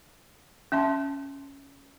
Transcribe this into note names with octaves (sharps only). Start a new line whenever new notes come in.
C#4 E5 A5 C6